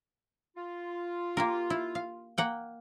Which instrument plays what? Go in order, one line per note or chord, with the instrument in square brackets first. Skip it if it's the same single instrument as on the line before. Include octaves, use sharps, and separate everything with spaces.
[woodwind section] F4
[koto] A#3 G4 A#4
E4
F5
A#3 F#5 G5